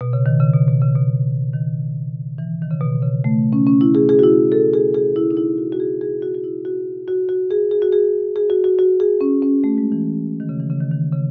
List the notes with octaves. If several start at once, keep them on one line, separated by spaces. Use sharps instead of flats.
B2
C#3
D#3
C#3
B2
B2
C#3
B2
D#3
E3
D#3
C#3
B2
C#3
A3
C#4
C#4
E4
G#4
G#4
F#4
E4
A4
G#4
G#4
E4
D#4
E4
F#4
F#4
G#4
G#4
F#4
F#4
E4
F#4
F#4
F#4
G#4
G#4
F#4
G#4
G#4
F#4
F#4
F#4
G#4
C#4
C#4
A3
G#3
E3
D#3
C#3
E3
C#3
D#3
D#3
C#3